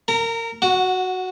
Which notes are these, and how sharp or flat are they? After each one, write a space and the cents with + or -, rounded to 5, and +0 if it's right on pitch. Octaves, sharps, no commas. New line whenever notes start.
A#4 -25 A#5 +0
F#4 +0 F#5 -25